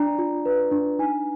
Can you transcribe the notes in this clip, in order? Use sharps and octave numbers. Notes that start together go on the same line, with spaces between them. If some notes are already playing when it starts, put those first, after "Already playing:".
Already playing: D4 D5 A#5
F4
B4
D4
D#4 G#5